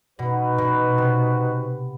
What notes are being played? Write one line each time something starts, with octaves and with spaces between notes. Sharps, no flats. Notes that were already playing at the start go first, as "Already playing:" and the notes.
B2 D#4 F#4 B4
B2
C3